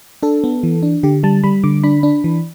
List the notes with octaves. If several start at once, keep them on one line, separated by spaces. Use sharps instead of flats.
D4 A4
B3
E3
D4
D3 G4
G3 A5
G3 B5
D3 D6
D4 B5
D4
E3